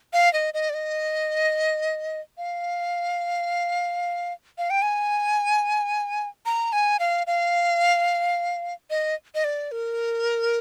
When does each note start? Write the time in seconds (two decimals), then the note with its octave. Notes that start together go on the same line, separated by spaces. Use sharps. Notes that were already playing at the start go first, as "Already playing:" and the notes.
0.13 F5
0.33 D#5
0.54 D#5
0.70 D5
0.74 D#5
2.38 F5
4.58 F5
4.70 G5
4.82 G#5
6.46 A#5
6.73 G#5
6.99 F5
7.27 F5
8.90 D#5
9.35 D#5
9.44 D5
9.72 A#4